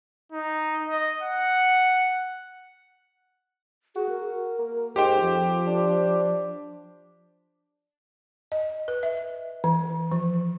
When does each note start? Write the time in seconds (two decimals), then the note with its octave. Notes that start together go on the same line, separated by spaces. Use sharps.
0.32 D#4
0.89 D#5
1.22 F#5
3.96 F#4 G#4
4.09 A#4
4.59 A#3
4.96 G#2 G4 C5 D#5 G5
5.21 F2 F3
5.67 D4
8.52 D#5
8.88 B4
9.03 E5
9.64 E3
10.12 F3